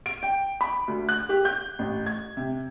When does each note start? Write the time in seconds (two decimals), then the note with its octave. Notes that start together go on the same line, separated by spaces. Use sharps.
0.06 D7
0.23 G5
0.61 B5
0.88 D2
1.09 F#6
1.29 G4
1.45 G6
1.79 A1
2.06 G#6
2.37 C3